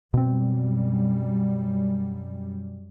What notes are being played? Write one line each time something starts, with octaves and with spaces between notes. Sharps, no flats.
F#2 B2 G3 C4